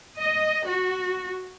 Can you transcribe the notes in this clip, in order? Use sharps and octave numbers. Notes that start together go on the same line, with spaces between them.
D#5
F#4